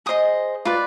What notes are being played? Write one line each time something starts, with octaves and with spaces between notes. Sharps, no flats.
G#4 C5 D#5 D#6
F4 B4 D5